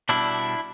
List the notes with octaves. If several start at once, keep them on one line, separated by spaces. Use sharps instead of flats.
B2 G3 D4 E4